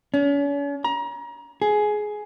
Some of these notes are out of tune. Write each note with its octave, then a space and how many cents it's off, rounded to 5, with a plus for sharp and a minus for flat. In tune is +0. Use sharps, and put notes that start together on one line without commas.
C#4 +40
A#5 +30
G#4 +15